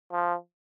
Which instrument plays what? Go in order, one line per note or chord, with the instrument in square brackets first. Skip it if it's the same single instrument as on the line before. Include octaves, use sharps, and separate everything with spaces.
[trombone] F3